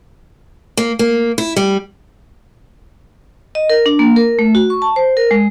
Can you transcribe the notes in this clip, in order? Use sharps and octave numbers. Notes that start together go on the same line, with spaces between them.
A#3
A#3
E4
G3
D#5
A#4
D4
A#3
A#4
A3
F#4
C#6
A5
C5
A#4
G#3